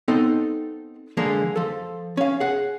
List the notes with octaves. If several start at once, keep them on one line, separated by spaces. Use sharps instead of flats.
B3 C4 D#4 A4 D#5 G5
D3 F3 G#3 A#3
F3 A4
C#4 F5
G#4 F#5